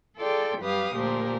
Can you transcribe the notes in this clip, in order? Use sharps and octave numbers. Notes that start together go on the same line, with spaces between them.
F4 G#4 A4 D5 G5
F#2 G3 G4 B4 F5 D#6
D2 A#2 F3 G4 A#4